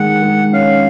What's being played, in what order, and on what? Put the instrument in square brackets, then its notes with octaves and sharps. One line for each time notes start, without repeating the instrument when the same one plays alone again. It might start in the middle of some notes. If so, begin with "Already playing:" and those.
Already playing: [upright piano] D#3 G#3 [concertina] F#5
[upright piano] G#3
[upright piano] C#4 [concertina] F5